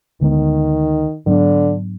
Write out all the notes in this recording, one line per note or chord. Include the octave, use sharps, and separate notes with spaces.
D2 D3 D#3 G#3 B3
G#2 D3 F#3 B3 D4